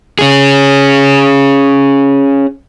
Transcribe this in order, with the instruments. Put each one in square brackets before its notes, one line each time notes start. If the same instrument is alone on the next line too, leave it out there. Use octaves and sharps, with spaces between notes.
[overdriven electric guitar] C#4 G#4